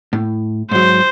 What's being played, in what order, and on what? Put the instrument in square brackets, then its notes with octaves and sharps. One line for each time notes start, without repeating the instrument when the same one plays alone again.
[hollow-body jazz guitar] A2
[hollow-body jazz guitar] G#2 F#3 [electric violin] C5